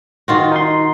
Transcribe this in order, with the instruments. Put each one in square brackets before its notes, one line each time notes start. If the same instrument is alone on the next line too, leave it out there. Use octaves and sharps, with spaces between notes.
[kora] D#3 F4 F#4
[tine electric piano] D#4 C6